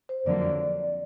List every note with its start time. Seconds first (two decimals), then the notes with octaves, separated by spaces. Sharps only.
0.09 C5
0.26 F2 D3 F#3 A#3 D5